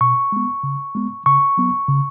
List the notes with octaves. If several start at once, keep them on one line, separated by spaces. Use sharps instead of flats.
B2 C#6
G#3 B3
C#3
G#3 B3
C#3 C#6
F#3 B3
C#3